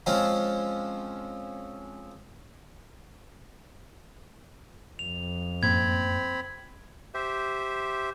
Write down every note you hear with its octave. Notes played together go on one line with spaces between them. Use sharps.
F3 G#3 C4 C#4 F4
F2 F7
F#2 A2 A#3 C4 B5 G#6
G4 C5 E5